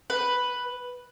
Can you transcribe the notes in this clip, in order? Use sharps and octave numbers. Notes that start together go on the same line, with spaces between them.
B4